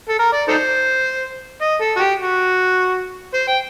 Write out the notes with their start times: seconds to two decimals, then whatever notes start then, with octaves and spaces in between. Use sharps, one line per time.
0.09 A4
0.19 A#4
0.33 D5
0.48 D#4 A4 C5
1.62 D#5
1.81 A4
1.97 F#4
2.00 G4
2.20 F#4
3.34 C5
3.48 G5